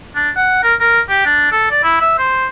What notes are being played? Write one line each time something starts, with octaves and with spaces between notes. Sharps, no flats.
D4
F#5
A#4
A#4
G4
D4
A4
D5
E4
E5
C5